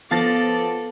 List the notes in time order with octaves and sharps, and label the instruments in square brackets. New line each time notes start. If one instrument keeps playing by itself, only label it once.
[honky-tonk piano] F3 A6 A#6 [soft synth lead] B3 [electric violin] A4 D5 [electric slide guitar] F5 A5